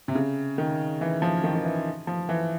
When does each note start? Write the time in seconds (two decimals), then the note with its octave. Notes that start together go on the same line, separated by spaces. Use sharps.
0.08 C3
0.15 C#3
0.58 D#3
1.01 E3
1.22 F3
1.44 D#3
1.55 D#3
1.65 E3
2.07 F3
2.29 E3